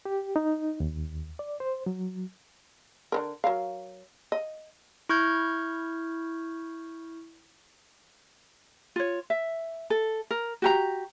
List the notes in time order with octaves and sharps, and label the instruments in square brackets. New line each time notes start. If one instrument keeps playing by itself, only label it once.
[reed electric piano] G4
D#4
D#2
D5
C5
F#3
[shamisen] D3 D#3 A#4
F#3 A#4 F5
D#5
[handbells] E4 C#6 F6 G6 G#6
[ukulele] F4 C#5
E5
A4
A#4
F#4 G4 A#5